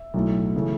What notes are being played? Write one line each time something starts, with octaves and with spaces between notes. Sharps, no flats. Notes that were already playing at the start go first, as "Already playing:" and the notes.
Already playing: E5
B1 A2 F#3 A3
C#3 E3 A3